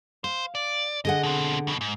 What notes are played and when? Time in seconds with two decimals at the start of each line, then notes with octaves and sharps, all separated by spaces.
0.24 C5 F5
0.55 D5
1.05 D3 G#4 D#5 F#5
1.23 B2 C4
1.67 F2 B2
1.81 G#2